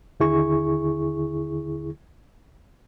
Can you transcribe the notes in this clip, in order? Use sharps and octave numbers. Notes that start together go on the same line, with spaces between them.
D#2 D3 E4 G#4 C#6